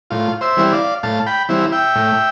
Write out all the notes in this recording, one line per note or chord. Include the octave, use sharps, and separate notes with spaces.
A2 F4
C5 E5
E3 G3 C4 E4
D5 F5
A2 F5 A5
G5 B5
E3 G3 C4 E4
E5 G5
A2